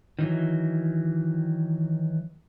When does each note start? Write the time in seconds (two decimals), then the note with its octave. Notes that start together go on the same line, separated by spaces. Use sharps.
0.19 D#3 E3 F#3